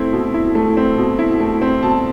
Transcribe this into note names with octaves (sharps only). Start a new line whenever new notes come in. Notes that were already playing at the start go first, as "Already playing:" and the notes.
Already playing: A3 C4 E4
B2
E4
A3
C4
B2
E4
A3
C4
B2 A5